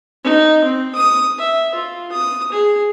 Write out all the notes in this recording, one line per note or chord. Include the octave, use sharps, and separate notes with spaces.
D#4
C4
D#6
E5
F4
D#6
G#4